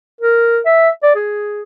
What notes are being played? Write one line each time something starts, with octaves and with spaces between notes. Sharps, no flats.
A#4
E5
D5
G#4